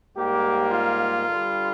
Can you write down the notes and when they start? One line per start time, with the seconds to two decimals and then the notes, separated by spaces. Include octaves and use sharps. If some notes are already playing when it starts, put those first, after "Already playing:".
0.16 G#2 G3 A#3 G4
0.71 F4
1.27 G2 D3 G3